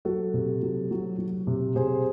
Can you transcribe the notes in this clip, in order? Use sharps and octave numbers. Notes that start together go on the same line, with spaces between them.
F#3 F#4 A4
C3
F#3
F#3
F#3
C3
C3 G#4 C5